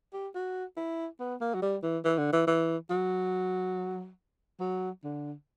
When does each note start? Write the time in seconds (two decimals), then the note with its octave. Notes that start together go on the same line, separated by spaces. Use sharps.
0.13 G4
0.35 F#4
0.77 E4
1.20 B3
1.41 A#3
1.55 F#3
1.62 G3
1.83 E3
2.05 E3
2.18 D3
2.33 E3
2.47 E3
2.90 F#3
4.60 F#3
5.04 D3